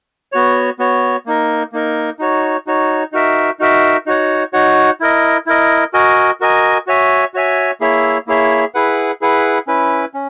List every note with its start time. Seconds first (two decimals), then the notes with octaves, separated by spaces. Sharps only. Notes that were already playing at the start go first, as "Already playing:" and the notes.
0.32 B3 F#4 C#5
0.79 B3 F#4 C#5
1.26 A#3 D#4 A#4
1.72 A#3 D#4 A#4
2.19 D#4 F#4 C#5
2.67 D#4 F#4 C#5
3.12 D#4 F#4 A#4 E5
3.59 D#4 F#4 A#4 E5
4.06 D#4 F#4 C#5 F#5
4.53 D#4 F#4 C#5 F#5
5.00 E4 A#4 D#5
5.46 E4 A#4 D#5
5.94 F#4 A#4 D#5 G#5
6.40 F#4 A#4 D#5 G#5
6.87 F#4 C#5 E5 G#5
7.34 F#4 C#5 E5 G#5
7.81 A#3 E4 G#4 C#5 E5
8.27 A#3 E4 G#4 C#5 E5
8.74 E4 G#4 B4 F#5
9.21 E4 G#4 B4 F#5
9.67 C#4 E4 B4
10.14 C#4